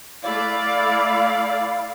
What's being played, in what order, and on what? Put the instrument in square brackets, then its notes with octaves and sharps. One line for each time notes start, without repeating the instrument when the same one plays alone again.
[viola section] A3 D5 [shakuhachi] E4 [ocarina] F5